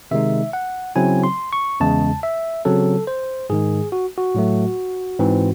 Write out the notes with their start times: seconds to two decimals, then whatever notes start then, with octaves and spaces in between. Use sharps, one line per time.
0.11 C3 D#3 G#3 D#4 E5
0.53 F#5
0.96 C#3 F#3 C4 E4 G#5
1.24 C6
1.53 C#6
1.80 E2 C#3 G#3 A5
2.23 E5
2.65 C#3 F#3 C4 A4
3.07 C5
3.50 G#2 D#3 G#3 G#4
3.92 F#4
4.18 F#4
4.35 A2 F#3 A3
5.19 G#2 E3 C4